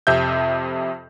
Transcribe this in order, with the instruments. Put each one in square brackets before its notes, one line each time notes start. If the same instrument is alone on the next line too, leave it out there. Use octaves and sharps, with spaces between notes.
[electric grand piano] F2 C3 E5 G6